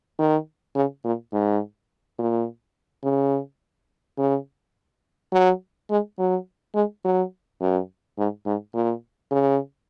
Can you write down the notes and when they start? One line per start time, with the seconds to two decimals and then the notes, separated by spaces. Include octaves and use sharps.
0.19 D#3
0.75 C#3
1.04 A#2
1.33 G#2
2.19 A#2
3.04 C#3
4.18 C#3
5.32 F#3
5.90 G#3
6.18 F#3
6.75 G#3
7.04 F#3
7.61 F#2
8.18 G#2
8.46 G#2
8.74 A#2
9.31 C#3